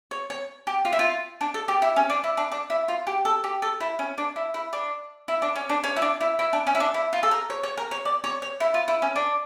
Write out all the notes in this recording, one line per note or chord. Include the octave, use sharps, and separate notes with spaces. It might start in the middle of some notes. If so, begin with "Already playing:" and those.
C#5
C#5
G4
F4
E4
F4
D4
A4
G4
E4
C#4
D4
E4
D4
D4
E4
F4
G4
A4
G4
A4
E4
C#4
D4
E4
E4
D4
E4
D4
C#4
D4
C#4
E4
D4
E4
E4
D4
C#4
E4
D4
E4
F4
A4
A#4
C#5
C#5
A#4
C#5
D5
C#5
C#5
E4
F4
E4
C#4
D4